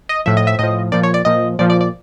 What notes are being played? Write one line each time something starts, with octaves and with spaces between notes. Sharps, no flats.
D#5
A2 F3 E5
D#5
E5
A2 F3 D#5
A#2 F3 D5
C#5
D5
A#2 F3 D#5
A#2 F3 D5
D5
D5